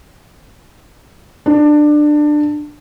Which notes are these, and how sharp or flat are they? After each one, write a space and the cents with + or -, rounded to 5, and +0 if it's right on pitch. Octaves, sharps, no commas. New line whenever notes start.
D4 +20